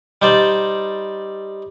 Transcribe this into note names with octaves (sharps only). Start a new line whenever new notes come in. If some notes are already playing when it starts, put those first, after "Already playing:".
G3 D#4 C5 D5